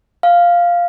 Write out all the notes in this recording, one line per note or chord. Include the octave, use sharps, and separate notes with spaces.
F5